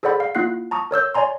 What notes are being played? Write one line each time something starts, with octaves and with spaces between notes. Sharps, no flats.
G#4 A4 C5 D5 F#5 B5
F5
A#3 E4 F4 F#5 F#6 C7
A5 A#5 C#6 D#6
A#4 C#5 E6 G6
C#5 D5 G#5 A#5 C6